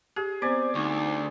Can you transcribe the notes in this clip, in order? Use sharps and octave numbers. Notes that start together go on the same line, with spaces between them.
G4 G#4
B3 C4 C5 D5 G#5
D2 D#4 C#6